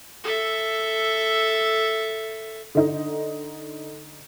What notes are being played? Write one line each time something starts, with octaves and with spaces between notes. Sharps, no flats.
A4 E5
D3 D#4